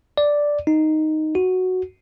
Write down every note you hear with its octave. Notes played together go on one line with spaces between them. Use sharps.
D5
D#4
F#4